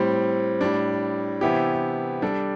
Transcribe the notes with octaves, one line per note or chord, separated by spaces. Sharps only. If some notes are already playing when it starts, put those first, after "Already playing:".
Already playing: A2 G3 C4
A2 G3 D4
C3 E3 B3 E4 G4
G3 D4 A4